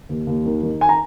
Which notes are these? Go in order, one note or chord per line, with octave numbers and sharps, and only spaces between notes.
D#2
D#2
D#3
D#3
G#5
A#5